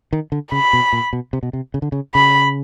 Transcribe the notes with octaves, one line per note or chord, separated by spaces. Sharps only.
D#3
D3
C#3 B5
B2
A#2
B2
C3
B2
C3
C#3
D3
C#3
C#3 B5